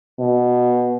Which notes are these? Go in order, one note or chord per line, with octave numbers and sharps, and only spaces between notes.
B2